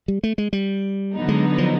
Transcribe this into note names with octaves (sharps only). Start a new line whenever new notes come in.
G3
A3
G#3
G3
D3 F#3 B3 D#4
G#3
F3